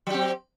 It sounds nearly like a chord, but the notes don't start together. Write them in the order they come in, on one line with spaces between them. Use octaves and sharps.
F#3 G4 C4